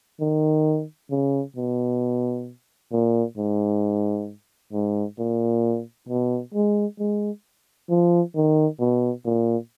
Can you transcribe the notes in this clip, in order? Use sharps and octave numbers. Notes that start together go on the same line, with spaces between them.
D#3
C#3
B2
A#2
G#2
G#2
A#2
B2
G#3
G#3
F3
D#3
B2
A#2